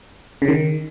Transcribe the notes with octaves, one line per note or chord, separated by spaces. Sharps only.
C#3
D#3